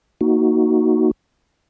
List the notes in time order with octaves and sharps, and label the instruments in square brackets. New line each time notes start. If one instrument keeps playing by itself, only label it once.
[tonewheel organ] A#3 D#4 F#4